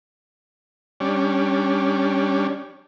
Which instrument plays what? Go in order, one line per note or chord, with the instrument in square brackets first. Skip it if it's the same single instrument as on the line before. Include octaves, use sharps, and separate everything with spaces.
[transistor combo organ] G3 C#4 D4